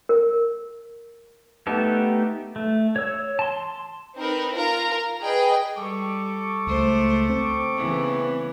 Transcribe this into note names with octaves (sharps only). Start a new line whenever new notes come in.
A#4
A3 B3 D#4 G4 A4
A3
C#5 E6
A5 C6
C4 D#4 A#4 B4
F4 A#4 A#5
G#4 B4 D#5 G5
G3 A4 C#6 D6
C#2 A3 C5
C4
C#3 E3 B3